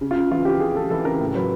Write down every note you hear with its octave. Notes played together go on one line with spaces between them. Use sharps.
C#3
F4
C#3
E3 F4
C#3 G4
C#3 G#4
E3 A4
E3 A4
C#3 A#4
A2
F#3 B4